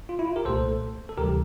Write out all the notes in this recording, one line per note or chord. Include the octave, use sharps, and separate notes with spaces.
F4
E4
F4
G4 A#4
C2 A#2 A3 A4 C5
A4
D2 C3 E3 G3 G4 A#4